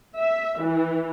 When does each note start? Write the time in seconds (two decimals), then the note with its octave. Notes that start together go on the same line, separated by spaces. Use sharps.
0.18 E5
0.61 E3